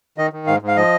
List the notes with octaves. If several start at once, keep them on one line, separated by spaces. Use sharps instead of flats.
D#3 D#5
D#3
G#2 F5
G#2
F5
F3 D#5